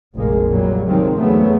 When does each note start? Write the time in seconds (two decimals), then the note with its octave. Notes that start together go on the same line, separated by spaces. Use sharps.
0.15 F1 A#1 G#3 A#3
0.49 A#2 F#3 G3 A#3
0.87 C3 D#3 F3 F#3 G#3 C4
1.16 E2 C#3 F#3 A3 B3